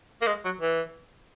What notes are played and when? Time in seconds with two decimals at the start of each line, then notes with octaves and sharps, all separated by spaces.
0.22 A#3
0.27 G#3
0.45 F#3
0.61 E3